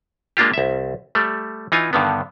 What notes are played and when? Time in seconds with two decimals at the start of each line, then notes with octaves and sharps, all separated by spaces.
0.37 G#3 A#3 D4 F4 G4
0.54 C2 E5
1.15 G3 A3
1.72 E3 D#4 F4 G#5
1.93 G2 D3 D#3 B3